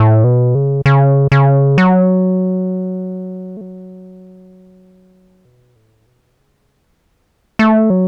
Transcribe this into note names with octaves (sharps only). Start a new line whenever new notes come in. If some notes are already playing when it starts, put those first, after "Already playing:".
Already playing: A2
B2
C#3
C#3
C#3
F#3
A3
F#3
B2
A2
B2
C#3
E3
A3
A3
F#3